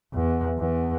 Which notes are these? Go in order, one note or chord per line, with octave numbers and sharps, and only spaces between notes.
E2
E2